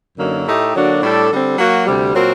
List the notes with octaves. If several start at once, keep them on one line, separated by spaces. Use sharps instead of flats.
F#2 D3 F#3 A#3 D#4
A2 A3 D#4 G4
D3 F#3 A#3 D4 F#4
A2 G3 D4 A4
D3 G3 C4
F#3 A#3 F#4
D2 C3 G3
A#2 F#3 C4 F#4 A#4